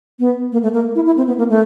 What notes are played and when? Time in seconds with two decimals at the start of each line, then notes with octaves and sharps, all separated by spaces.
0.20 B3
0.52 A#3
0.63 A3
0.74 A#3
0.95 E4
1.06 E4
1.17 C4
1.27 B3
1.38 A#3
1.49 A3